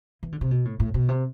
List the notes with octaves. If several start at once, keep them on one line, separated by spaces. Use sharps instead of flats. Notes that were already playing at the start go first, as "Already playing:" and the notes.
E3
D3
C3
B2
A2
A2
B2
C3